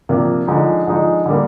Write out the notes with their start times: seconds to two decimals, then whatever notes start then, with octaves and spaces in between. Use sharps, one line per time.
0.09 C3 F3 A#3 D4
0.47 D3 F3 G#3 D#4
0.87 D3 F3 G#3 D#4
1.26 D3 G3 A#3